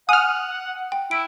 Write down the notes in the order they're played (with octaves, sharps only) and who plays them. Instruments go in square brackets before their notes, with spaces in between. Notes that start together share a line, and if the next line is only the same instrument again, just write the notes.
[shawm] F#5 [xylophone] G#5 [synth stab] D#6 F6
[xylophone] G5
[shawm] E4 [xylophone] D7